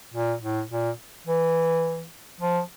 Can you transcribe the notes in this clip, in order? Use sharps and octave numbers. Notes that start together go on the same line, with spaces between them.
A#2
A2
A#2
E3
F3